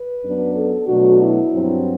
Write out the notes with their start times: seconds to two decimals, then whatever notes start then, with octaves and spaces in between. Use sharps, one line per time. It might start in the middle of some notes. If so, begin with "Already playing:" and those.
Already playing: B4
0.23 F#2 F#3 B3 D4
0.55 A4
0.87 B2 F#3 A3 D4 F#4
1.20 E4
1.52 G2 F#3 C4